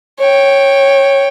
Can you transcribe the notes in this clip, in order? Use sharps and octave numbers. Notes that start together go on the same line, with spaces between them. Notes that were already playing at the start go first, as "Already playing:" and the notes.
C#5 G5